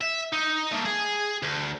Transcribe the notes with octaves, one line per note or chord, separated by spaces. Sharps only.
E5
D#4
A3 A#3
G#4
D2